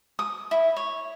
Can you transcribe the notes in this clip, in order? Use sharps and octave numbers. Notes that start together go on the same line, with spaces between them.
D#6
E4
C#5